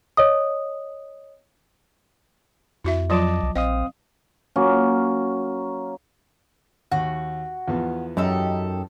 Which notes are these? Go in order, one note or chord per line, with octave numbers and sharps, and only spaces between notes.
C#5 D#5 D#6
F2 E4 F#4 E5
F3 F#3 F4 D#5 A5 D6
C2
A#1 C4 D#5 F5 D#6
F#3 A#3 C#4
D#2 F#4
E2 F3 B3
F#2 D#4 G4 A4